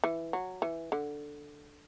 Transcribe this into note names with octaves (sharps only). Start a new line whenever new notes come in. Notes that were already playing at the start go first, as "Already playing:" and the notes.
E3
F#3
E3
D3